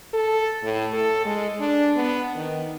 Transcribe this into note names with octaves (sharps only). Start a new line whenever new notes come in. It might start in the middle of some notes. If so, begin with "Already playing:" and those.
A4
A2
A4
G#3
D4
B3
D#3